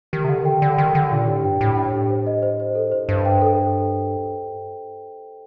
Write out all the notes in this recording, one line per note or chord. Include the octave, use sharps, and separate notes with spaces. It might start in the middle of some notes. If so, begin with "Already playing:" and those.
D#3 G4
C3
D3 G4
D#3
D3 G5
D3 D5
D#3 G5
D3 G5
A#2 D4
A2 G4
G2 G5
A2 G4
D4
G4
C5
D#5
C5
C5
A4
C5
G2 C5
G5
A4